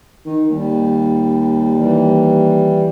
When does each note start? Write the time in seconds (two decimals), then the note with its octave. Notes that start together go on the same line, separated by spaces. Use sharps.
0.26 D#3
0.50 D#2 G3
1.76 E3 G3